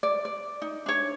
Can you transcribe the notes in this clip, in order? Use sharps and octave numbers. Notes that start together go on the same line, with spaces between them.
D5
D5
D#4
D4 C#5